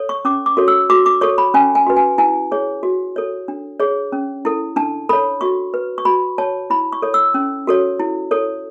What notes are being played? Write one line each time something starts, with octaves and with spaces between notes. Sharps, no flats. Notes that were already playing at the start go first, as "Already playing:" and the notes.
Already playing: A4 C#5
C#6
C#4 D6
D6
F#4 A4 C#5
E6
F#4 D6
D6
A4 C#5 C#6
B5
C#4 G#5
G#5
F#4 B4
G#5
E4 G#5
G#4 C#5
F#4
A4 C#5
D4
G#4 C#5
C#4
E4 A4
D4 A5
A4 C#5 B5
F#4 C#6
B4
C#6
F#4 B5
C#5 A5
E4 B5
C#6
A4 C#5
E6
C#4
F#4 A4 C#5
E4
A4 C#5